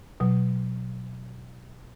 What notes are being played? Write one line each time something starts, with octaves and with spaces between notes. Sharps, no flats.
B2 F#3